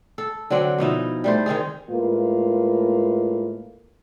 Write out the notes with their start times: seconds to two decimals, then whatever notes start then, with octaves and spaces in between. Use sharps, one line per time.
0.18 A4
0.50 D3 F#3 C4 F#5
0.78 B2 F3 D#4 E4
1.24 G3 A3 C5
1.46 D#3 C4 D#4 G#4
1.91 A2 G#3 A#3 F4 B4